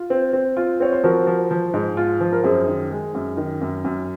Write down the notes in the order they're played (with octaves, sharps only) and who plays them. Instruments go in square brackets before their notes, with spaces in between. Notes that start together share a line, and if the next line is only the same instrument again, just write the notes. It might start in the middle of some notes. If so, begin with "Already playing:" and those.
Already playing: [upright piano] F4
C4
C4
F4
[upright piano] C4 [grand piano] C#5
[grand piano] C5
[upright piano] F3 [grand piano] F#4 A#4
[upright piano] F3
F3
G#2
F4
F3
[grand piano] A#4
[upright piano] F#2 [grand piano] G#4 C5
[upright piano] D#3
G#3
F#2
D#3
F#2
F#2